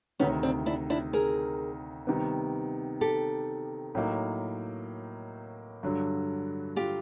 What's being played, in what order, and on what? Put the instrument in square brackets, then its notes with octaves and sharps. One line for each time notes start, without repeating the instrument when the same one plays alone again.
[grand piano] D2 C3 D#3 [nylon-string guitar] B3 C#4
[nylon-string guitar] C4 D4
D4 E4
D4 E4
G#4 A#4
[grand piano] C3 D#3 G3 B3
[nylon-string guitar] G4 A4
[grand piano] A2 F#3 A#3 D#4
G2 D3 F#3
[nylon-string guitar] F4 G4